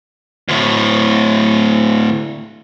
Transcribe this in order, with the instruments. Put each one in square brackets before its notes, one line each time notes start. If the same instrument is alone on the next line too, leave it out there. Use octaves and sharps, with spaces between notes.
[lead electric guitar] D2 A2